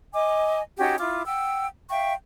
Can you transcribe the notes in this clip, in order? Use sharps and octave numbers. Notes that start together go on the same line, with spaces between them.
D#5 G#5 D6
C#4 D#4 F#4 G4
E4 F4 D6
F#5 G5 E6
E5 F5 G5 C#6